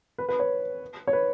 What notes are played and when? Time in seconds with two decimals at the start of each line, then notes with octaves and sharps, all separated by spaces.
0.18 B4
0.29 B4
0.39 C#5
1.07 C#5
1.13 B4